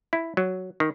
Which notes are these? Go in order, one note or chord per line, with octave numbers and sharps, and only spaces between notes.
E4
F#3
D#3